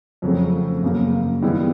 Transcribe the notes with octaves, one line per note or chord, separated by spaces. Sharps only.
F2 C#3 F#3 A3 C4
F#2 C#3 F#3 A#3
D#3 G3 B3 E4 G#4